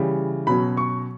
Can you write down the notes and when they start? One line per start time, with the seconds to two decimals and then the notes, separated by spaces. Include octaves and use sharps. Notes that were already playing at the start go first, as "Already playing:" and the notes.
Already playing: C#3 E3 G3
0.47 B2 F#3 C#4 B5
0.77 C#6